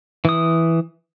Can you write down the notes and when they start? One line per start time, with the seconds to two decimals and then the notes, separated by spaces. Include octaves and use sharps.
0.25 E3 D#6